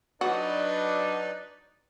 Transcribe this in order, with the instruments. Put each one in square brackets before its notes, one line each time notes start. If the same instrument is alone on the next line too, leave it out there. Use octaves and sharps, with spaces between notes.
[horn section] F#3 D4 [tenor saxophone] D#4 [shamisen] F#4 [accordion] B4 D5